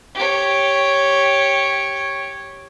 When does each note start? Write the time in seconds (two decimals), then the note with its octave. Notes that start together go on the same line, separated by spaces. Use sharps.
0.15 G4 C#5